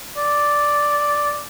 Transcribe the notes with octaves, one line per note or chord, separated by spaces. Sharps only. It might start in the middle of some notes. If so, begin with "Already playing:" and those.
D5